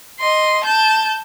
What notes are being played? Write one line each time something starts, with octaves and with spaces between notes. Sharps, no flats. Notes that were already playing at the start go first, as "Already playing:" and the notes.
D#5 C6
A5 G6